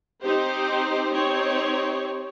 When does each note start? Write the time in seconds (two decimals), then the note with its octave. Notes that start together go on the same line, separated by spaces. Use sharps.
0.22 C4 D#4 G4 C5
1.12 C4 D#4 G4 C#5